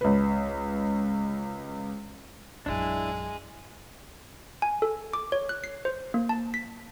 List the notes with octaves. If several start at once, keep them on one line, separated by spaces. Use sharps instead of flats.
C#2 B4
A#1 F#2 G#3 D4 E4
G#5
A4
D6
C#5
F#6
C7
C5
A#3
A5
B6